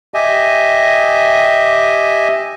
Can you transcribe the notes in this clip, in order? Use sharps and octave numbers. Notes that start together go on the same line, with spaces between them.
G4 D#5 E5 G#5